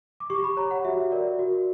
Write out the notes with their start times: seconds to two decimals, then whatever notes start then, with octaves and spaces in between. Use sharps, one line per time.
0.20 D6
0.30 G4 C#6
0.44 B5
0.57 C#5 A#5
0.71 F#5
0.85 F#4 E5
1.12 A#4 D5
1.39 F#4